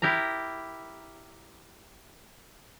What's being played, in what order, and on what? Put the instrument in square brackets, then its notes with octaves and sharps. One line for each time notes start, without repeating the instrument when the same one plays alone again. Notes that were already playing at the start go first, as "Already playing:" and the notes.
[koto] E4 G4 A#4 A#5